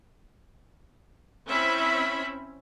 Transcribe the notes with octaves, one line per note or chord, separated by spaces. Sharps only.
C4 C#4 E4 E5 B5